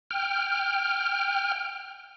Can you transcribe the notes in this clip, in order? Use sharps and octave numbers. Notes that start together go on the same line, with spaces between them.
G5 F6